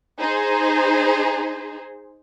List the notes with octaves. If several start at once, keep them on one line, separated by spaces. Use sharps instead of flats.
D#4 G#4 C5